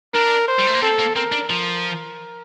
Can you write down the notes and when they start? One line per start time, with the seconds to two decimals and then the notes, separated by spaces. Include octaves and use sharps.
0.14 D4 A#4
0.48 C5
0.59 G3
0.67 A3
0.74 A#3
0.81 C4 A4
0.99 A#3
1.16 C4 A#4
1.32 D4
1.49 F3 A#4